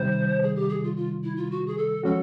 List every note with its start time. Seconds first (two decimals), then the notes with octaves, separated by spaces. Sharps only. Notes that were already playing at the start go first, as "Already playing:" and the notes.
Already playing: C3 D#3 G3 C5
0.42 G#4
0.55 G4
0.69 G#4
0.83 F4
0.96 F4
1.23 E4
1.36 F4
1.51 F#4
1.66 G#4
1.77 A4
2.03 F3 G#3 C#4 F#4 A4